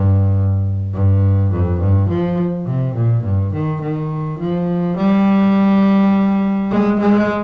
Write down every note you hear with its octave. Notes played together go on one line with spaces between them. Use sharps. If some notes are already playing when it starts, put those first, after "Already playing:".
Already playing: G2
G2
F2
G2
F3
C3
A#2
G2
D#3
D#3
F3
G3
G#3
G#3